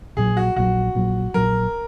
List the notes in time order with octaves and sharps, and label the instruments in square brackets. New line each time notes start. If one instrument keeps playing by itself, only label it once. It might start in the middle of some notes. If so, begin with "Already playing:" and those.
[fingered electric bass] A#1 A#2 F#3 [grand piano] G#4
[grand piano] F#4
[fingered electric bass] A#1 A#2 F#3 [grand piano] F#4
[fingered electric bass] A#1 A#2 F#3
[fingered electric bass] A#1 A#2 F#3 [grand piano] A#4